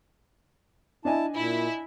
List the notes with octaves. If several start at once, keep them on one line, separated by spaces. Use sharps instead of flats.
D4 E4 D#5 G#5 A5
A#2 E4